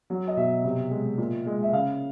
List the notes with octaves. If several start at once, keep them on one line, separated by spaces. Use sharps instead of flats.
F#3
D#5
B2 E5
C3
G#3
A#2
G#3
E5
C#3 F5